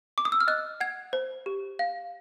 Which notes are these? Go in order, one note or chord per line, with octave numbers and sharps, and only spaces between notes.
D6
D#6
E6
F6
D#5 F#6
F#5 G#6
C5
G4
F5